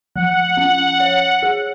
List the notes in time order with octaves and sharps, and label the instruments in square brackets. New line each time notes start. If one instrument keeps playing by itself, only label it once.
[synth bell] F3 [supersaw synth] F#5
[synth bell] C#4
C#5
G#4